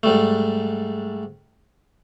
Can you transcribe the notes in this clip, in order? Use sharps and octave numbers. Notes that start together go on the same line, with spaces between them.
G#2 G3 A3